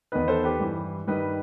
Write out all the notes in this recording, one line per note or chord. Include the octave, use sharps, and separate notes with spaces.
E2 D#3 B4 D#5
A4 C5
G4 B4
G2 E3
G2 D#3 B4 D#5